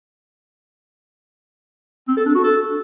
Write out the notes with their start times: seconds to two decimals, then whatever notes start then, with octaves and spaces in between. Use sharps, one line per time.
2.08 C4
2.17 A4
2.26 D4
2.35 F#4
2.44 A4